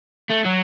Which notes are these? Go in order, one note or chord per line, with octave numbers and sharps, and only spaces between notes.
A3
F#3